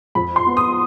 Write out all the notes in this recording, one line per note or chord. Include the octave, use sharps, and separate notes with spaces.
F2 B5
C6
B3
D#6